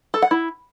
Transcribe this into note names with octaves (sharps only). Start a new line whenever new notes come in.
A4
F#5
E4